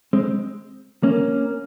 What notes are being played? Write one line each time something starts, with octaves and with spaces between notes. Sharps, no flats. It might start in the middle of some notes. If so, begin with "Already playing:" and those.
G#3 C4
A#3 C#4